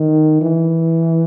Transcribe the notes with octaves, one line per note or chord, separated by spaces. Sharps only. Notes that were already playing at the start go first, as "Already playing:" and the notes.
Already playing: D#3
E3